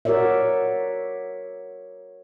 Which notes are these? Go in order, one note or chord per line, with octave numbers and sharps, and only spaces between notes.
F#4 A#4 C#5 D5 E5